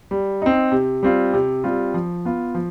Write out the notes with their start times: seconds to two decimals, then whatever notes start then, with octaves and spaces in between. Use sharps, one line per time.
0.11 G3
0.42 C4 D#4
0.72 C3
1.03 G3 C4 F4
1.34 C3
1.64 G3 C4 F4
1.94 F3
2.25 B3 F4
2.55 F3